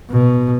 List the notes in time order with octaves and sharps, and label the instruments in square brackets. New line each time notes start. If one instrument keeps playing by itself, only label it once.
[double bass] B2